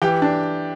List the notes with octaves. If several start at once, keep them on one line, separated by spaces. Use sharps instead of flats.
E3 G4 G5
D4